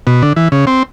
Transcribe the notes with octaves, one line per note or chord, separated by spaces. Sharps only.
B2
D3
E3
C#3
C4